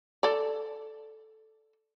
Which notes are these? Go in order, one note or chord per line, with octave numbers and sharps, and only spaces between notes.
A4 D5